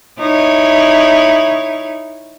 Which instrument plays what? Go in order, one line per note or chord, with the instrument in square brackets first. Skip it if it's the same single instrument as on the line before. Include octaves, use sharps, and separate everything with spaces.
[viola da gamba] D#4 E4 C#5